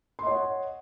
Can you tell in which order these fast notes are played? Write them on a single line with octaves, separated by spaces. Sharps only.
C6 D#5 C#5 F#5